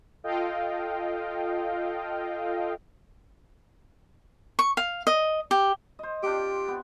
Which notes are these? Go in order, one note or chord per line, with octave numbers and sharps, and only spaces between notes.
F4 A4 D#5 F5 G5
C#6
F5
D#5
G4
C5 D#5
C4 D4 F4 G4
B3